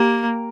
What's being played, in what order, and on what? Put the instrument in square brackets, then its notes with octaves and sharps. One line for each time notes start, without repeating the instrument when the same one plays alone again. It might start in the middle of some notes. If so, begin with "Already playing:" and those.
Already playing: [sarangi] A#3 [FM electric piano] G4